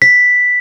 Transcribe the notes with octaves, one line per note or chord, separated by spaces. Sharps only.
B6